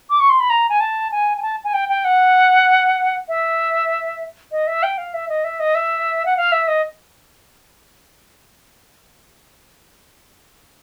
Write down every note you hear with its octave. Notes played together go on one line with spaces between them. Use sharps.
D6
C#6
C6
B5
A#5
G#5
A5
G#5
G#5
A5
G#5
G5
G5
F#5
E5
D#5
E5
G5
F5
E5
D#5
E5
D#5
E5
F#5
F5
E5
D#5